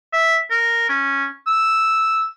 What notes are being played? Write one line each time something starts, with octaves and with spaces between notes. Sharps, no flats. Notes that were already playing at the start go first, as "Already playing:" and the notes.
E5
A#4
C#4
E6